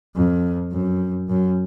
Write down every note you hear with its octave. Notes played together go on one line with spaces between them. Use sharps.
F2
F#2
F#2